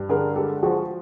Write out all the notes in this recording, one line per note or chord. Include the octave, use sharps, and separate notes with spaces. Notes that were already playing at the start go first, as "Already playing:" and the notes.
Already playing: G2
D3 G#4 A#4
G#3 G4 A4
F3 F#4 G#4